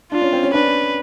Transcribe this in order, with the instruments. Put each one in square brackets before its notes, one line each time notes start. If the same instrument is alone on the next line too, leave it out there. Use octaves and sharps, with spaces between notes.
[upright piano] D4 [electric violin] F4
[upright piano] C#4
C4
C#4
[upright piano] D4 [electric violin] B4